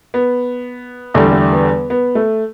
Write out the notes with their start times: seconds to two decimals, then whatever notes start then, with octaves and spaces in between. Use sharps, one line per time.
0.14 B3
1.14 E2 D3 G3 A3
1.32 A3
1.52 B3
1.90 B3
2.15 A3